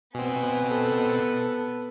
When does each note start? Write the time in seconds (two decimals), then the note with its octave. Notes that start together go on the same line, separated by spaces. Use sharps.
0.15 B2 B3 C4 G#5
0.70 A4